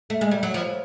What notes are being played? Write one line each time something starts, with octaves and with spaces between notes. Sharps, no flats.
A3
G#3
G3
F#3
F3